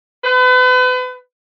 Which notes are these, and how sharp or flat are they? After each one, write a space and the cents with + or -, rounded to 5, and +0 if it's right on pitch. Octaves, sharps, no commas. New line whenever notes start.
B4 +35